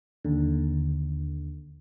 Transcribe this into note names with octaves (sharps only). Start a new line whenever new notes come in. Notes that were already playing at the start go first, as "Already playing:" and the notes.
D#2 D3